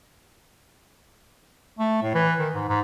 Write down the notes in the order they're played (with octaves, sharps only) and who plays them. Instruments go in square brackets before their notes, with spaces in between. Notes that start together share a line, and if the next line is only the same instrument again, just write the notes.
[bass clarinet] A3
A2
E3
D#3
G#2
G#2